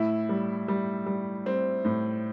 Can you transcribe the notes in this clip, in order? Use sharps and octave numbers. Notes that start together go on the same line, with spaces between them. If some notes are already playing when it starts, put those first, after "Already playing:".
Already playing: A2 E4
G3
G3
G3
G3 C4
A2